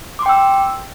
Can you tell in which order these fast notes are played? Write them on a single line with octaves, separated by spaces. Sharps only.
D6 C6 G5 E6